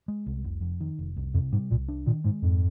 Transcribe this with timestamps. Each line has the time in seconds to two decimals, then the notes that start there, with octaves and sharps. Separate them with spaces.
0.08 G#3
0.26 C2
0.44 F1
0.61 F2
0.80 D#3
0.99 F1
1.17 C2
1.34 F2 C3
1.52 G#2 G3
1.70 C2 A#2
1.88 D4
2.06 A#2 D#3
2.24 G#2 G#3
2.42 F2 G#2